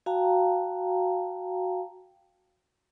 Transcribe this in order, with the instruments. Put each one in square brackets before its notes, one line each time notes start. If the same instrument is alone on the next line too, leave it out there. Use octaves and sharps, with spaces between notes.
[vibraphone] F#4 F5 G5 A5 A#5